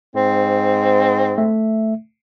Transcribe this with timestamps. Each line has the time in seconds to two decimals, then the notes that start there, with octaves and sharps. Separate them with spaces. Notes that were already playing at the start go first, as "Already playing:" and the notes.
0.16 G#2 C4
1.38 A3 E5